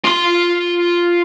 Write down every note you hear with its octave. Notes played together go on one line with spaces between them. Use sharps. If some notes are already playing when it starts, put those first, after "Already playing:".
F4 C6